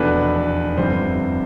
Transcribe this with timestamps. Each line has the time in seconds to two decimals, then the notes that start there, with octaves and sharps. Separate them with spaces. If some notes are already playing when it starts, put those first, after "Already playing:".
Already playing: F1 E2 B2 A3 D4 B4
0.78 G1 F2 C3 G3 C5